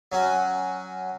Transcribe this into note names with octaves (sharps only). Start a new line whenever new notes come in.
F#3 C#4 F#4